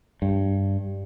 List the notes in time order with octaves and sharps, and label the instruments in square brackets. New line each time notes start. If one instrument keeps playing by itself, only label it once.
[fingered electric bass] G2